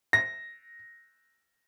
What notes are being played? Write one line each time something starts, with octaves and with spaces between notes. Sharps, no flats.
A#6